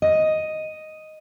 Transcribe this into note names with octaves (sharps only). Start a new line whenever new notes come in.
D#5